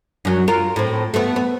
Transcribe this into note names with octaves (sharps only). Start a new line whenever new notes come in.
F#2 F#3
F4 A#4
A2 C4
A3 B3
B3